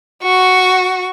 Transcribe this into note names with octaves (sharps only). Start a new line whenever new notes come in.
F#4 C#6